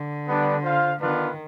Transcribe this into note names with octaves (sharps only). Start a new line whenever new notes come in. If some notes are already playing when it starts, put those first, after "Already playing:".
Already playing: D3
G3 B3 D4
F4 C5 F5
D#3 B3 D4 F4 B4